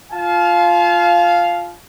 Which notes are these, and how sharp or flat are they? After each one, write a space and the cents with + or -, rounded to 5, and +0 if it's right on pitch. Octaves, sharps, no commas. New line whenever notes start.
F4 +0 F5 +0 A5 -40